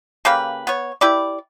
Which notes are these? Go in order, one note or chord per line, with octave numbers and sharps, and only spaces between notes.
C#3 A#3 G4 B4
B3 C#5
E4 G4 B4 D5